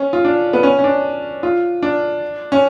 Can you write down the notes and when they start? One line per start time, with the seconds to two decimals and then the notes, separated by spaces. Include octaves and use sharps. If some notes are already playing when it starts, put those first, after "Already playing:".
Already playing: C#4
0.13 F4
0.25 D4
0.53 B3
0.63 C#4
0.79 C#4
0.84 D4
1.43 F4
1.83 D4
2.52 C#4